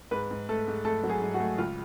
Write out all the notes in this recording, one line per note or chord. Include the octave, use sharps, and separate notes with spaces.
G#2 B4
G#2
A3 A4
G#2
A3 A4
F#3
G#4
G#2
F#4
A3
C#2 F4